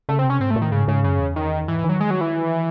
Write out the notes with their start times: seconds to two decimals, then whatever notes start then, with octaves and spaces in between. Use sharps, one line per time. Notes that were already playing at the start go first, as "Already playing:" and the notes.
0.09 C#3 A3
0.19 C4
0.24 C3
0.30 C#4
0.40 G#2 C4
0.50 A3
0.56 A2
0.62 D#3
0.72 G#2 C#3
0.88 G#2 C#3
1.04 F#2 C#3
1.20 E2
1.36 D#3
1.68 G#2 E3
1.79 E3
1.84 D#3
1.89 F#3
2.00 G#3
2.11 F#3
2.21 E3